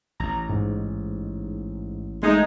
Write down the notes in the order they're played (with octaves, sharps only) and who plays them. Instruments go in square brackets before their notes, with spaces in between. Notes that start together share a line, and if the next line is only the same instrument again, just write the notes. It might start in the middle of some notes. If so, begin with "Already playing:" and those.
[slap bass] A1 [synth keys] A#5
[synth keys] G#2
[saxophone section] G#3 D#4 [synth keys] A3